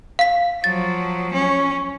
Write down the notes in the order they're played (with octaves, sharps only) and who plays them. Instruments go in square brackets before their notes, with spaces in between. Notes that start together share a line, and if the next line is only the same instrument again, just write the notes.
[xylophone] F5 B6
[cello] F3 F#3 [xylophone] A6
[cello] C#4